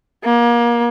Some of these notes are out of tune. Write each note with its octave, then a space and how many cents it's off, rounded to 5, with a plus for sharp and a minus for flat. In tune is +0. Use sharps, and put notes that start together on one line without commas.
A#3 +30